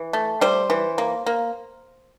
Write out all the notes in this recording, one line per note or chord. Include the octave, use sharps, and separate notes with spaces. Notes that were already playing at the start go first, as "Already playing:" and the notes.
Already playing: E3
A3
G3 C5
E3
A#3
A#3